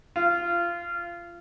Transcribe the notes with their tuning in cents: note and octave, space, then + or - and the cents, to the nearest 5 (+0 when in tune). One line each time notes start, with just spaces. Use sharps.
F4 -20